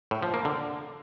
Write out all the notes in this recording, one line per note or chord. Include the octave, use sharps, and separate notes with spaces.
A2
F3
A#3
D3